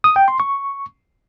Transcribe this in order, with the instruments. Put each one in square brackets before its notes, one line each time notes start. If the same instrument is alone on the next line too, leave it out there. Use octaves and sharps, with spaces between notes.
[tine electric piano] D#6
G5
C6
C#6